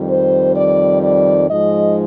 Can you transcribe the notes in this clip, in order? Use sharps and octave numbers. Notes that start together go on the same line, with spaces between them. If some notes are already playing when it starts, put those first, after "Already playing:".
Already playing: F2 D#3 G3
C5
D5
D5
G#2 F3 G#3 D#5